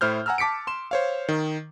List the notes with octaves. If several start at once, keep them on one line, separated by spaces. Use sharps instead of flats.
A2 E4 C5 F6 G6
F#5 G#5 A#5 E6 F6
A5 D6 B6 C#7 D7
C6 E7
C5 C#5 F5
D#3